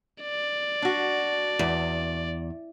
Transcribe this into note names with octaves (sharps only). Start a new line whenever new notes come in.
D5
D4 F#4
E2